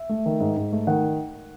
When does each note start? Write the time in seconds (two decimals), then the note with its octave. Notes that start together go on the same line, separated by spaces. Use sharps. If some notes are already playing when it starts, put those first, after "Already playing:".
Already playing: E5
0.09 A3
0.26 D#3
0.40 G#2
0.57 G#2
0.72 A3
0.87 D#3 F#5